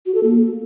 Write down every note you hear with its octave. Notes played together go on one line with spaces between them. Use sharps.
F#4
A4
A#3